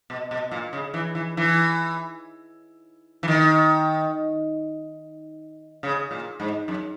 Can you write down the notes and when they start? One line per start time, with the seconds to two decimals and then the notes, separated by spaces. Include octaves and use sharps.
0.10 B2
0.31 B2
0.51 A#2
0.73 C#3
0.94 E3
1.15 E3
1.37 E3
3.23 E3
3.28 D#3
5.83 C#3
6.11 A#2
6.40 G#2
6.68 F#2